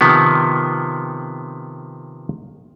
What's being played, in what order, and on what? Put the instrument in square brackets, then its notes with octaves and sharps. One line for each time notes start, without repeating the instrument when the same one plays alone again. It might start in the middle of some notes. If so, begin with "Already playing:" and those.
[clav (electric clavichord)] C3 D#3 F3 B3